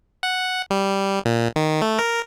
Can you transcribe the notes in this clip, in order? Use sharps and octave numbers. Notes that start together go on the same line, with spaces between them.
F#5
G3
A#2
D#3
A3
A#4